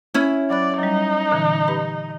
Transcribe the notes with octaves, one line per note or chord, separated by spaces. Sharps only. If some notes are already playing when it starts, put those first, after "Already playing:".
C#4 E4
F#3 D5 B5 F#6
F#3 G3 D#4
A#2 D3 E3
G4 B4 B5